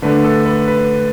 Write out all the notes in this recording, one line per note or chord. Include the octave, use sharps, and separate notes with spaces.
D3 A3 D4 B4
A4
B4
B4